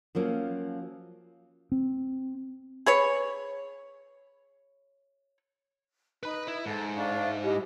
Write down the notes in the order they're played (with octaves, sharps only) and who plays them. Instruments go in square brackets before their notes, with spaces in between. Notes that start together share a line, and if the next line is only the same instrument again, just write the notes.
[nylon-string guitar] F3 F#3 A#3 C#4
[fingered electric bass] C4
[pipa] G#4 B4 C#5
[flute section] D#4 [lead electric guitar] B4 B5
[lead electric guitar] E4
[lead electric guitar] G#2 [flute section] A4
[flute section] D4 F5 C#6
[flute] E5
[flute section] E4 D#5 [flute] G4